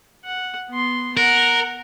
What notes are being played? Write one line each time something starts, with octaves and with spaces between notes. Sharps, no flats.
F#5
B3 C6
A#4 F#5